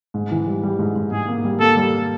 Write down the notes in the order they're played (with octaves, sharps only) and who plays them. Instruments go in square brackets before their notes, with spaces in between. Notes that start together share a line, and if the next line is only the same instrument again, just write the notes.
[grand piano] G#2
E3
G3
G3
G#2
G#2
[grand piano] G#2 [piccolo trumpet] G#4
[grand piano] A#3
G3
[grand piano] A#3 [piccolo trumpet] A4
[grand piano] G3